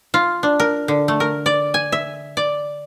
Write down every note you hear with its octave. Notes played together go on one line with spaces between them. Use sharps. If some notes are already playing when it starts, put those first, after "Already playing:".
F4
D4
A#4
D3
A3
A#4
D5
G#5
E5
D5